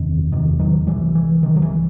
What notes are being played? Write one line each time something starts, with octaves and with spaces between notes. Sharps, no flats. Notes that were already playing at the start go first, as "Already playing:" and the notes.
Already playing: F#1 E2 C3 D#3
F#1 E2 C3 D#3
D#3 F#3
C2 C3 E3 G3
E3
C2 C3 D#3
F#3
E3